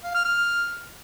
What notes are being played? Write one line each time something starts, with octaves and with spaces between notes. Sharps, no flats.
F5
F6
F6